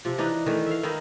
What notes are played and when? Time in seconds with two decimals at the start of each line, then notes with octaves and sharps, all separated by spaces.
0.05 C3 F3
0.18 E3 D4 D#4 B4
0.46 D#3 E3 A3
0.67 E5 F5
0.83 D#3 D#4 E4